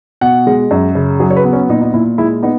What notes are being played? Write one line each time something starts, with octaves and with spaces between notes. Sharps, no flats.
B2 F#5
G#3
F#2
C#3
F#3 G#4
C#5
B4
B3
C#4
A#2 D#4
D#4
A#2 E4
G#3 E4
B3 D#4